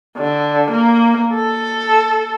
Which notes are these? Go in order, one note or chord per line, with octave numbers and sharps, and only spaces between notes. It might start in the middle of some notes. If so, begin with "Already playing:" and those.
D3
A#3
A4